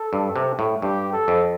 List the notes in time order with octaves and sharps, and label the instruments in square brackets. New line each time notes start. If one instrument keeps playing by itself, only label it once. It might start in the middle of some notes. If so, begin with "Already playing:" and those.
Already playing: [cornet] A4
[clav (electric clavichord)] G2
C3
A2
[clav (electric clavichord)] G2 [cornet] G4
[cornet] A4
[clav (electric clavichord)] F2